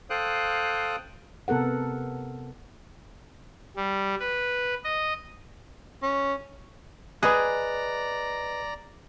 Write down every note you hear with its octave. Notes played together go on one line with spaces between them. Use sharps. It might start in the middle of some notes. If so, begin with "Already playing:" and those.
A4 C5 F5 G5 D#6 F#6
C3 B3 A4 A#4 F#5
G3
B4
D#5
C#4
G#4 B4 D5 D#5 A#5 F#6